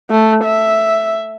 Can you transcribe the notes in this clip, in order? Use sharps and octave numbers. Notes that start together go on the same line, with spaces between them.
A3
E5